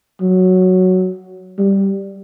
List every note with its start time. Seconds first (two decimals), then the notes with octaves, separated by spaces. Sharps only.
0.21 F#3
1.58 G3